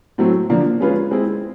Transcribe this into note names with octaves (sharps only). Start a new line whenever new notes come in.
A2 F#3 A3 C4
D3 F3 A#3 D4
G#3 C#4 F4 G#4 B4
G#3 C4 E4 G#4